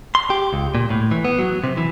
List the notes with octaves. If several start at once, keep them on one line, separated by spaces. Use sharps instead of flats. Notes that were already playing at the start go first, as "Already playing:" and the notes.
C6
G4
C#2
A#2
A2
E3
B3
F#3
C3
E3